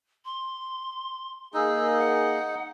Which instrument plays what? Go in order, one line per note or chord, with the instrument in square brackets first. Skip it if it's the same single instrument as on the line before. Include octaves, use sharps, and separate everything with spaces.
[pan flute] C6
[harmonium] A#3 G#4 [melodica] D#4 [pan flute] E6
[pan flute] F#5